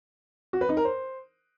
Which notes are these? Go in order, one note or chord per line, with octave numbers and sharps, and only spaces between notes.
F#4
B4
D#4
A#4
C5